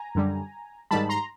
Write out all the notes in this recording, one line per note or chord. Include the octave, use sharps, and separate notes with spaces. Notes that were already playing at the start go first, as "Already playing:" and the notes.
Already playing: G#5 A#5
F#2 D3 G3
G#2 D#3 G3 A5 B5
A#5 C6